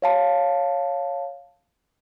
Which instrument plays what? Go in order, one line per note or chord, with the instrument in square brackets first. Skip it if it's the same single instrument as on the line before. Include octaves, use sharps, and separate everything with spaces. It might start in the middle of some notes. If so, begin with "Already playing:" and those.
[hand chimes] C#5 F5 A5